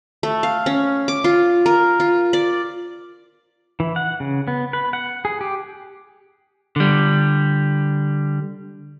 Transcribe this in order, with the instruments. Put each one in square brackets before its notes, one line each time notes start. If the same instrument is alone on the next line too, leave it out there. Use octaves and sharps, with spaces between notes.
[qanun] A3
F5
C#4
D6
F4
A#4
F4
D5
[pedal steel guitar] E3
F#5
C#3
B3
B4
F#5
G#4
G4
[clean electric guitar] D3 G3